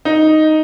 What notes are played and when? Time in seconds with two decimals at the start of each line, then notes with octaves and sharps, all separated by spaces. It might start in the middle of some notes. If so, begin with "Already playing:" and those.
0.05 D#4